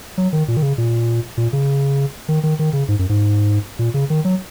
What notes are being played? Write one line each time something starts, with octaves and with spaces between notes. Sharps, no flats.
F#3
D#3
A#2
D#3
C#3
A#2
A#2
C#3
D#3
D#3
D#3
C#3
G#2
F#2
G#2
A#2
C#3
D#3
F#3